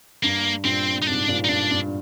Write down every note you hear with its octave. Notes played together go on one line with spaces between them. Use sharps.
G2 A#3
G2 A#2 C4
D#4
G#2 C3 D4
C3
G2 A#2
D#4
G2 D4
G2